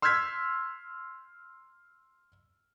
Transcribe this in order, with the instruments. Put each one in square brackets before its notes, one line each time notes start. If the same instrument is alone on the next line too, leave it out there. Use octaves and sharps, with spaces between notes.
[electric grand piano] C6 E6 F6 G6 G#6 B6